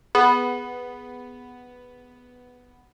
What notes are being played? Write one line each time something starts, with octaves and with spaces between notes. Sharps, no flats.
B3 G#4